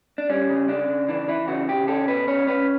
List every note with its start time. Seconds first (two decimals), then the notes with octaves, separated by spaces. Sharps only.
0.18 D4
0.30 G3 C#4
0.50 C#3
0.68 C#3 D4
0.88 C#3
1.08 E3 D4
1.28 E3 E4
1.48 C#3 F#4
1.68 C#3 G4
1.88 C#4 A4
2.07 B2 B4
2.28 C#4 C#5
2.47 C#4 B4